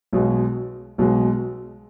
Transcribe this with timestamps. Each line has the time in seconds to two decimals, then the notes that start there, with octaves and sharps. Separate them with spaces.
0.13 B1 B2 G#3
0.98 B1 B2 G#3